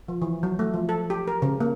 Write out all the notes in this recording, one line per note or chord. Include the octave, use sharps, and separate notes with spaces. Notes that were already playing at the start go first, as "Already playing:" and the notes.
F3
E3
F#3
A3
F3
A4
G4
A#4
C#3
A#3